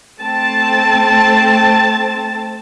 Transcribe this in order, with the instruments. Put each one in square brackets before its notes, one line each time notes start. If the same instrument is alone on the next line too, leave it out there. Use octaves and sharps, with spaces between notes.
[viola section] A3 C4 A5